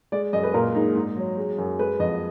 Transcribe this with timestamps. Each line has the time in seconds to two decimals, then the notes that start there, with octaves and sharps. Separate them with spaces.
0.12 G#3 D5
0.33 F#2 D#5
0.43 B4
0.54 A#2 A#4
0.75 G#3 D#4
0.95 G#2
1.16 F#3
1.37 G#3
1.58 F#2
1.79 G#3 B4
1.99 F2 D#5